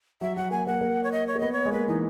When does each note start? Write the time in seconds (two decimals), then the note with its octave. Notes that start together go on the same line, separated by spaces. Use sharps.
0.21 F#3 E5
0.36 F#3 F#5
0.51 A#3 G#5
0.67 A#3 F#5
0.81 A#3
1.04 C#5
1.12 D#5
1.27 C#5
1.36 A#3
1.40 B3 D#5
1.52 C#5
1.65 G#3
1.72 A#3 B4
1.88 E3 D#4